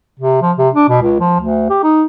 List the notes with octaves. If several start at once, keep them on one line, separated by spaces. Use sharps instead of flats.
C3
F3
C3
D4
B2
C#2
F3
D2
G4
D#4